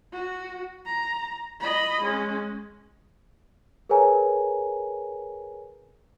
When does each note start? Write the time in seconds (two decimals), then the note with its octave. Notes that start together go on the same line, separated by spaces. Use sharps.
0.12 F#4
0.86 A#5
1.60 D#5 B5
2.01 G#3 C#4
3.89 G#4 A#4 B4 C#5 G#5 A#5